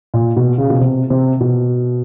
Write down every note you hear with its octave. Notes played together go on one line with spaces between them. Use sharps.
A#2
B2
C#3
B2
C3
C3
B2